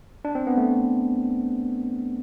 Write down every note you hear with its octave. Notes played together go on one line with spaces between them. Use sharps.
D4
C4
B3
A3